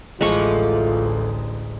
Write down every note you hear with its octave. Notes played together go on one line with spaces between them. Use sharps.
A1 D2 E3 F3 G#3 F4 A4 C#6